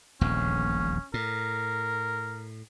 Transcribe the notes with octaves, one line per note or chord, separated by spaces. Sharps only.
D#1 A#1 E2 C#4
A2 A#4